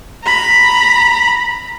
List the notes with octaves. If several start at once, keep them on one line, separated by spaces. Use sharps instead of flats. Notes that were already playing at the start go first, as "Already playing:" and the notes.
A#5 B5